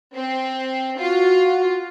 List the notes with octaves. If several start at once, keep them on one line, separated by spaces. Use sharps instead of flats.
C4
F4 F#4